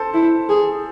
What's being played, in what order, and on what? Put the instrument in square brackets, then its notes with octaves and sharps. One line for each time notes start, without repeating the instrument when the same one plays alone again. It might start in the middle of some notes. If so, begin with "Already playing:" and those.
Already playing: [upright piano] A4 C5
[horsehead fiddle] E4
G#4